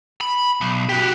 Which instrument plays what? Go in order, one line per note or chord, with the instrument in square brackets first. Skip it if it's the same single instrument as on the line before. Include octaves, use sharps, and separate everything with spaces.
[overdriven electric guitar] B5
B1
F#4 G4